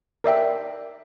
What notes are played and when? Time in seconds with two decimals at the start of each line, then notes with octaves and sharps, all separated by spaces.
0.24 A#4 D5 E5 G5